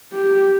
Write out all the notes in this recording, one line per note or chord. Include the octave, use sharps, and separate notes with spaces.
G4